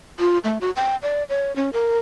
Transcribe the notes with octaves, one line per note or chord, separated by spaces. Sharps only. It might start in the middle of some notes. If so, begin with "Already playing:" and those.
F4
A3
F#4
G5
D5
C#5
C#4
A#4